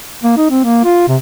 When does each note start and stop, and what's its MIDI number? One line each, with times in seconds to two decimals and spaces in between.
0.23 0.35 58
0.37 0.50 63
0.50 0.63 60
0.64 0.83 58
0.84 1.05 65
1.08 1.16 48